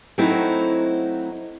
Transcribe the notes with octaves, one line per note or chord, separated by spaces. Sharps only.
F#3 A3 C4 D#4 E4 F#4